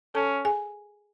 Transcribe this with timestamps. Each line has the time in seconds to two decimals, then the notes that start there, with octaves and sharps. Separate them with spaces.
0.15 C#4 A4 A5
0.45 G#4 G#5